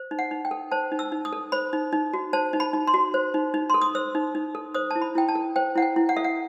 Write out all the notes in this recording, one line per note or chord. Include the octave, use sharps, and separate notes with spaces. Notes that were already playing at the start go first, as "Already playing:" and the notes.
Already playing: C5
D#4
F#5
D#4
G5
A4
C5 A5
D#4
E6
D#4
D#6
A4
C5 B5
D#4
D#4
F#4
C5 A5
D#4
B5
D#4
C6
F#4
C5
D#4
D#4
A4 C6
D#6
C5 E6
D#4
D#4
A4
C5 D#6
E4 A5
B5
E4 G5
A5
A4
C5 G5
E4 F#5
G5
E4
F#5
A4 E5
F#5